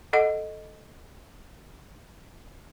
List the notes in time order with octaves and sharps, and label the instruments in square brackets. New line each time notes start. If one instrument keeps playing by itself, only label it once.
[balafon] A4 D#5 F#5